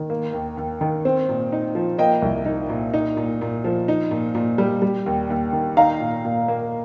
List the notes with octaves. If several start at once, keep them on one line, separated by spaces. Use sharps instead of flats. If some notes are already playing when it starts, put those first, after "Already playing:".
Already playing: D#3
A#3
D#2
D#2
D#3
C4
A#2
D#4
F3
A#3 D#5 G5
C2
D#4
A#2
D#4
A#2
A#2
F3
D#4
A#2
A#2
G3
G3
D#2
D#2
D#3
D#4 F5 A#5
A#2
A#2
A#3